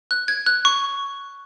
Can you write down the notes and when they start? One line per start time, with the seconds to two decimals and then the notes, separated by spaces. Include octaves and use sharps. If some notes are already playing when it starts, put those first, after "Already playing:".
0.11 F#6
0.28 G#6
0.46 F#6
0.65 C#6